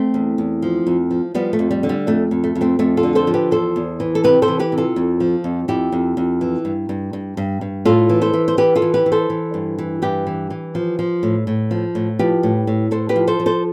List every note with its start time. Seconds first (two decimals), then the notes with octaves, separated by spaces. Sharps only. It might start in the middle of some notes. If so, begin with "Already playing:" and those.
Already playing: A3 C4
0.14 E2
0.38 E2
0.62 F3
0.87 F2
1.11 F3
1.35 F3 G3 B3
1.53 A3
1.59 F2
1.71 G3
1.83 D3
1.89 G3
2.07 F2 A3
2.31 F2
2.44 A3
2.55 F2
2.61 A3 C4
2.79 F2 A3 C4
2.97 F4 A4
3.03 D3
3.15 A4 C5
3.27 F3
3.34 G4 B4
3.51 E2 A4 C5
3.76 E2
4.00 E3
4.15 A4
4.24 C3 G4 B4
4.42 A4 C5
4.48 E3
4.60 G4 B4
4.72 C3
4.78 F4 A4
4.96 F2
5.20 F3
5.44 F2
5.68 F2 E4 G4
5.92 F2
6.17 F2
6.41 E3
6.65 G2
6.89 G2
7.13 G2
7.37 G2
7.61 G2
7.85 A2 F4 A4
8.09 E3
8.21 A4 C5
8.33 E3
8.48 C5
8.57 E3 G4 B4
8.76 F4 A4
8.82 E3
8.94 G4 B4
9.06 E3
9.12 A4 C5
9.30 E3
9.54 G2
9.78 E3
10.02 G2 G4 B4
10.27 E3
10.50 E3
10.75 F3
10.99 F3
11.23 A2
11.47 A2
11.71 F3
11.95 A2
12.19 F3 G4 B4
12.43 A2
12.67 A2
12.91 A2 A4 C5
13.09 G4 B4
13.16 F3
13.27 A4 C5
13.40 F3
13.46 A4 C5